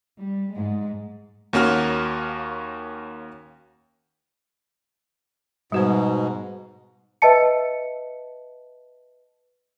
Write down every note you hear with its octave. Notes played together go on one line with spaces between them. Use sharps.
G3
G#2 G#3
D#2 A#3 C#4 F#4 F6
G#2 B2 G3 F#4 C5
B4 D#5 E5 A5 C#7